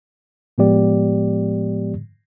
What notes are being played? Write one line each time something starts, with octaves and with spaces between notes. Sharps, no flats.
A2 F3 G#3 B3 G4 D5